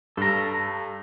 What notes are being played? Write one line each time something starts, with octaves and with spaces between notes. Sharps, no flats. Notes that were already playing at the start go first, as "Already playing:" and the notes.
G2 A4 A#5